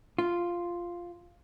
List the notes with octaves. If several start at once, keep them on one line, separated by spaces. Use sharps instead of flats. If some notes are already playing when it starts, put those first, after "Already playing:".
F4